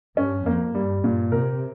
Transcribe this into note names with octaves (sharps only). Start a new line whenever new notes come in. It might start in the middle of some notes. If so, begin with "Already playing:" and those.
G2 C#4
F2 A#3
G2 G3
G2 A#2
C3 A#4